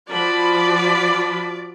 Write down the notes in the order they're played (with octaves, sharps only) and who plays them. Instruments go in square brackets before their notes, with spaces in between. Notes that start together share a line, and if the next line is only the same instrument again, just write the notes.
[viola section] F3 F#4 B5 [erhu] D5